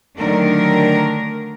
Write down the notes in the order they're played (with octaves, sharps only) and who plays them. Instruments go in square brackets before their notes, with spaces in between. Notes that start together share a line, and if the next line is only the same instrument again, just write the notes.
[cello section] D3 D#3 F#3 A3 D4 A#4